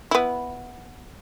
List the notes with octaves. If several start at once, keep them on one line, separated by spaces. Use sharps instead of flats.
B3 E4